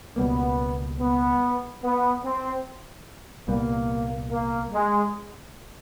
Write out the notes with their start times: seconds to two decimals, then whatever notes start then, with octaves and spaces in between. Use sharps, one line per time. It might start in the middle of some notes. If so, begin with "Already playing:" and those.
0.16 C#2 B2 G3 A#3 B3
0.99 B3
1.83 B3
2.24 C4
3.48 C2 A#2 G3 A#3 B3
4.31 A#3
4.73 G#3